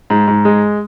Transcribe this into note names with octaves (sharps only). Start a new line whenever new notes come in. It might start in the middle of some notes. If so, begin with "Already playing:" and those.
G#2
G#2
G#3